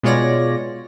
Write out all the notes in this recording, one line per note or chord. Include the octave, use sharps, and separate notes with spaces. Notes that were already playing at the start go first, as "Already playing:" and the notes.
B2 G#3 F4 C#5 D5 A#6